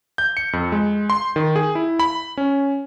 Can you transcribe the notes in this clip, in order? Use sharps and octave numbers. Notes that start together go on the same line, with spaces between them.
G6
C#7
F2
G#3
C6
D#3
G#4
E4
B5
C#4